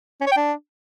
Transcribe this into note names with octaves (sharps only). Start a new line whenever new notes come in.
C#4
C#5
G5
D4